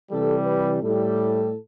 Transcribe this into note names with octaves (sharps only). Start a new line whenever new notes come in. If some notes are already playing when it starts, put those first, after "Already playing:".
C3 E3 G3 A4
B4
A2 G3 A4